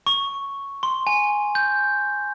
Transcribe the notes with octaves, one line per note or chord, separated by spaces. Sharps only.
C#6
C6
G#5
G6